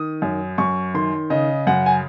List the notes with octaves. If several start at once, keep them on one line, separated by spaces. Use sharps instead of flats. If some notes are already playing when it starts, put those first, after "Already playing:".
Already playing: D#3 D#6
F#2
F#2 C#6
D#3 C6
C#3 D#5
F#2 F#5
G#5